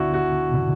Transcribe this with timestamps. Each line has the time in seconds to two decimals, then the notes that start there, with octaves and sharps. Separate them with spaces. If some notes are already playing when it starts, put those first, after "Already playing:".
Already playing: D2 D3 B3 D4 E4 F#4
0.14 F#4